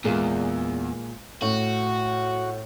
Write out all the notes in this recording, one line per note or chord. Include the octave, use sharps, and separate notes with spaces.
E2 A#2 G#3 A#3
A2 F#4